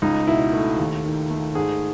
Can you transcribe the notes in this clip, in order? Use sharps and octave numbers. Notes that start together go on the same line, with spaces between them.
C#2 D#4
B2 E4
A3
D#2
D#3
A3
G#2 G#4